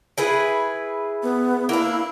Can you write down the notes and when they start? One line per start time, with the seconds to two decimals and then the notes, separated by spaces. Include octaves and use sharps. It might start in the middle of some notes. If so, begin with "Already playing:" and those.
0.18 E4 G#4 B4
1.23 B3
1.69 A#3 D4 E4